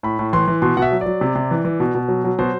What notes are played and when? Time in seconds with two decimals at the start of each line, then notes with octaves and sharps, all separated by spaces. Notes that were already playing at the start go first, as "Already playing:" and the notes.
0.03 A2 B5
0.19 A2
0.33 E3 C6
0.48 E3
0.62 B2 C6
0.77 B2 F#5
0.82 E5
0.92 F#3
1.01 D5
1.06 F#3
1.21 C3
1.35 C3
1.51 E3
1.65 E3
1.80 B2
1.95 B2
2.08 F#3
2.24 F#3
2.39 B2 C5